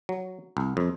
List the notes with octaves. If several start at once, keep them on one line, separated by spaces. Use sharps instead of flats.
F#3
C2
F2